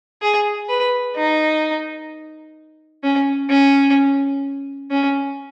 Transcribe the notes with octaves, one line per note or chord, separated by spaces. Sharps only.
G#4
B4
D#4
C#4
C#4
C#4